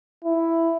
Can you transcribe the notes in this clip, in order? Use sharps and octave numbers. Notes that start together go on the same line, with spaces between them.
E4